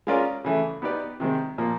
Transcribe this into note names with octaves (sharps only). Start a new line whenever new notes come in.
G#3 C#4 F4 A#4 D5
C#3 E3 A3
B3 D#4 G4 B4 D5
C3 D#3 G#3 C4
A#2 F3 A#3